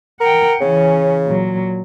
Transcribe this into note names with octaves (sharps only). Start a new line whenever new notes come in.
A#4 F#5 G5
C#3 E3 C#4
A#2 F#3